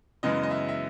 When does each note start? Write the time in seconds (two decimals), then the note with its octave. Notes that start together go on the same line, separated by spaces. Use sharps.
0.23 F#2 C#3 E3 G#3 B3 D#5
0.43 D#5
0.51 E5
0.69 E5